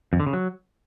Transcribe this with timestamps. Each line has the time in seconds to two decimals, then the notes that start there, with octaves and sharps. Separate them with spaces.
0.13 F2
0.20 D3
0.26 C#3
0.33 F#3